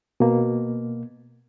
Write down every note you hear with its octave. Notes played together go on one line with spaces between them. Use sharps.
B2 A#3